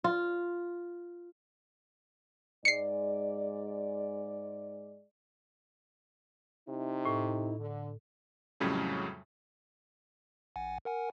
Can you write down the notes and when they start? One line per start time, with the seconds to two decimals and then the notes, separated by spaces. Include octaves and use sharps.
0.04 F4
2.65 G#2 G#3 D5 C7 C#7
6.69 C3 D#4 E4
7.05 A2
7.59 D3
8.60 F2 A2 C#3 F#3 G3 C#4
10.56 A1 F#5 G#5
10.85 A#4 F#5 G#5